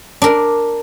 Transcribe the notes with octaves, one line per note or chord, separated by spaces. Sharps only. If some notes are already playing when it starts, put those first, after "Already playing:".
D4 A#4